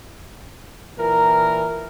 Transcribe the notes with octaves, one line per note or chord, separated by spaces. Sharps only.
A#2 E3 A#4